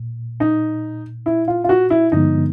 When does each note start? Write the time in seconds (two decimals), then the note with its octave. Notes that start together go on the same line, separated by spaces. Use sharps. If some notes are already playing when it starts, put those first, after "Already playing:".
Already playing: A#2
0.40 D#4
1.26 E4
1.48 F4
1.64 F4
1.69 F#4
1.90 E4
2.12 G2 D3 F3 G#3 B3 D#4